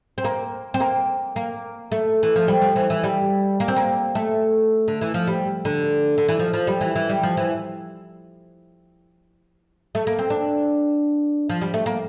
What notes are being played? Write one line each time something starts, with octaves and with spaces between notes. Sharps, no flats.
C4
A#3
C4
A#3
A#3
A3
E3
F3
G3
F3
E3
E3
G3
A#3
C4
A#3
A3
D3
E3
F3
G3
D3
D3
E3
F3
F3
G3
E3
E3
G3
F3
E3
A3
A#3
C4
D4
F3
G3
A3
A#3